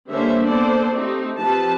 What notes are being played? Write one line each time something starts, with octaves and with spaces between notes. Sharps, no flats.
D3 G3 A#3 C#4 C5 E5
A#3 B3 A4 C5 D5
A3 C4 D#4 G4
F3 C4 G4 B4 A5